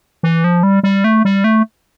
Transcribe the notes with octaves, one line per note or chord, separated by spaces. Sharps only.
E3
F3
G3
G3
A3
G3
A3